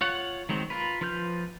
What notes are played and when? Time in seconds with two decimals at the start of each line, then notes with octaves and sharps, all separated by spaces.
0.01 F4 C#5 F#5
0.49 D#3 F#3 G#3 C4
0.70 F4 A#4 B4
1.01 F3 F4 B4 F6 G6